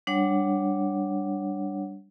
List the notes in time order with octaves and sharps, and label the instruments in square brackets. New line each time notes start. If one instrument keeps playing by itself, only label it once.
[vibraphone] G3 D4 C#5 F#5